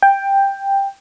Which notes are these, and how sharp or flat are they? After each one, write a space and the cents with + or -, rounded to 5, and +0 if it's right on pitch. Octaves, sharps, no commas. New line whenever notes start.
G5 +10